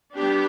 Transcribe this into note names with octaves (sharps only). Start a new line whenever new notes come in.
G3 B3 D4 G4